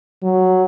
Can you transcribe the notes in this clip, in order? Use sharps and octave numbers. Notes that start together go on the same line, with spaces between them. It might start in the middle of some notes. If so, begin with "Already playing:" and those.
F#3